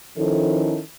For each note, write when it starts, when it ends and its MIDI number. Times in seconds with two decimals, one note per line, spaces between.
0.18 0.80 51
0.18 0.80 53
0.18 0.80 61
0.18 0.80 64
0.18 0.80 69